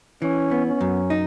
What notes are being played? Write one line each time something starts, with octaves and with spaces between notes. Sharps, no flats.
E3 C#4
B3
C#4
F#2
D#4